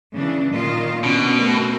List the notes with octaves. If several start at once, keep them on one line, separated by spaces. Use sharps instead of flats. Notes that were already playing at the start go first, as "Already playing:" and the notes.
C#3 E3 D4
A#2 D#3 F4
B2 C#4 D4
A3 C4 A#4